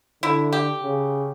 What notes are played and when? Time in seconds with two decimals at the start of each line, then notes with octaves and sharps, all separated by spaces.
0.23 D3 E4
0.53 G4
0.83 C#3